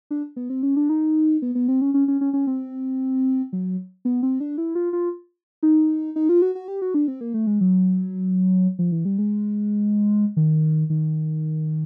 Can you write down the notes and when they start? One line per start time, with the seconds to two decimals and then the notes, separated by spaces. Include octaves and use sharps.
0.11 D4
0.36 B3
0.50 C4
0.63 C#4
0.76 D4
0.89 D#4
1.42 B3
1.55 B3
1.68 C4
1.82 C#4
1.94 C#4
2.08 C#4
2.21 C#4
2.34 C#4
2.47 C4
3.53 F#3
4.05 B3
4.23 C4
4.40 D4
4.58 E4
4.75 F4
4.93 F4
5.63 D#4
6.16 D#4
6.29 F4
6.42 F#4
6.55 F#4
6.68 G4
6.82 F#4
6.94 D4
7.08 C4
7.21 A#3
7.34 A3
7.47 G#3
7.61 F#3
8.79 F3
8.92 E3
9.05 G3
9.18 G#3
10.37 D#3
10.90 D#3